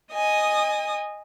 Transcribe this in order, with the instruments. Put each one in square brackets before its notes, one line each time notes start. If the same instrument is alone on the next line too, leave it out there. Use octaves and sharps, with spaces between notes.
[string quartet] D#5 G#5 D#6